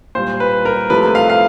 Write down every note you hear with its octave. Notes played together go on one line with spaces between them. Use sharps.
A#2 G3 C5
B4
A#4
C3 F3 A3 B4
F5
F5